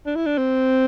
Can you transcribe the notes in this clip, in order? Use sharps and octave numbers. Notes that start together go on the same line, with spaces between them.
D4
E4
D4
C4